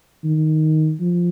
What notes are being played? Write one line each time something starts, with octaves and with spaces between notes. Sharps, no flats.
D#3
F3